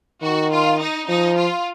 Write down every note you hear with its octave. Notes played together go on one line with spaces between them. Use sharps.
D#3 F#4
F4
D#4
F3 D#4
F4